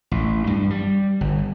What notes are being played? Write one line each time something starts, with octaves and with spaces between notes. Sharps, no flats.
A1
G2
G3
G1